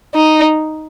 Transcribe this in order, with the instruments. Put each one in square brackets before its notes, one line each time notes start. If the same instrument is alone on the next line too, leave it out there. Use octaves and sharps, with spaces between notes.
[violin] D#4